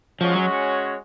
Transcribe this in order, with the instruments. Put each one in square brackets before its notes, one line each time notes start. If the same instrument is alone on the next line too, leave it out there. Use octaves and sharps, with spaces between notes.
[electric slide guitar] F3 [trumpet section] G#3 C#4 F#4 C#5
[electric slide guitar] F#3